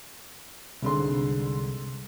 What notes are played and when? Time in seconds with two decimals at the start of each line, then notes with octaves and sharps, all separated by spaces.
0.82 C2 G#2 D3 C6